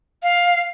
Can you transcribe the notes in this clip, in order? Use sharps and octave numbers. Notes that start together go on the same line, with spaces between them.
F5